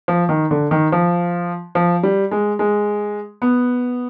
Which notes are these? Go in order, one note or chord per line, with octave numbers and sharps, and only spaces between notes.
F3
D#3
D3
D#3
F3
F3
G3
G#3
G#3
B3